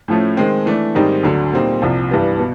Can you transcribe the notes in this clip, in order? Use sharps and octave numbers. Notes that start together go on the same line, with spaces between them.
A2 F3 A3 C#4
D#3 G#3 C4
E3 A3 D4
G#2 D#3 G3 C4 D#4
D2 D3 F#3
A#2 G3 C4 D#4
C2 C3 F3
G2 E3 G3 B3
B2